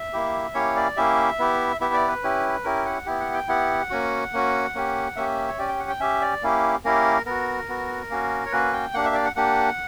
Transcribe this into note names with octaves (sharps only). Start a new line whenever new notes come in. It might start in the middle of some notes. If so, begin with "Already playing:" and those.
Already playing: E5
A#3 E4 G4
A#3 C#4 E4 G4 C#5
D5
A#3 C#4 E4 G4 E5
B3 E4 G4
B3 E4 G4 E5
D5
B4
C#4 E4 G4
C#4 E4 G4 A#4
F#5
B3 E4 G4
F#5
G5
B3 E4 G4 F#5
A#3 C#4 F#4
A#3 C#4 F#4
A#3 C#4 G4
A#3 C#4 G4 E5
C#5
C#4 G4 D5
G5
F#5
G5
C#4 G4 E5
D5
A#3 C#4 E4 G4
A#3 C#4 E4 G4 A#4
B3 F#4 A#4
B3 F#4
A#3 C#4 F#4
C#5
A#3 C#4 F#4 B4
G5
A#3 D4 G4 F#5
E5
D5
F#5
A#3 D4 G4 F#5